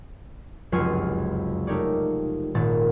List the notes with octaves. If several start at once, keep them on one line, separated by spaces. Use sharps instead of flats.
F1 C#2 F#2 F4 G#5 C#6
A3 D#4 G4 A#4 C#5 D5
D#1 G#1 A#2 A6